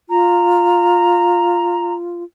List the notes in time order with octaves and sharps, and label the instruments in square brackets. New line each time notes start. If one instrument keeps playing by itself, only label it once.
[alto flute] F4 [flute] A#5